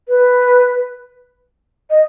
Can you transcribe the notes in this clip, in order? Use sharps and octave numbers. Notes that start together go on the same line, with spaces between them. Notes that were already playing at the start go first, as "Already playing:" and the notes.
B4
D#5